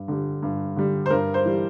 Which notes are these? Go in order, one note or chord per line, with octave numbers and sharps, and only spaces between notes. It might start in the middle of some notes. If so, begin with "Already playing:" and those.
Already playing: G2
D3 G3
G2
D3 G3
C5
G2 A#4
C5
E3 G3